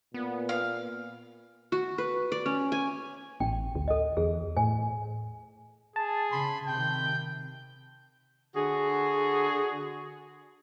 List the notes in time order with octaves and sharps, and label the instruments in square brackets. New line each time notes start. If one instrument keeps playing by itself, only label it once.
[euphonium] A#2 [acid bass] B3
[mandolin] F5
[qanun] F#4
B4
D5
C#4
G#5
[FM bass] A1 [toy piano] G5
[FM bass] D2
[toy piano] A4 D#5
[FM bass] E2 [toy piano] G#4
[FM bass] A2 [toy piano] G#5
[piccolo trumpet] G#4 [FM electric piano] A5
[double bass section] C#3 [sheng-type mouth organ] B5 C6
[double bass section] C3 D#3 [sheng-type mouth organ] G5 [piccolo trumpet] G6
[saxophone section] D3 F#4 G#4